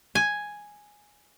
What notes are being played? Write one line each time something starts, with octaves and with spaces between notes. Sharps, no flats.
G#5